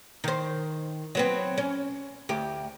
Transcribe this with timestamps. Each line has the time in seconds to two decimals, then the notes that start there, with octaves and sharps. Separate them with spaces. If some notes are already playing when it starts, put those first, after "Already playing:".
0.24 D#3 C5
1.15 F#3 B3 C4
1.58 C#4
2.29 D2 G4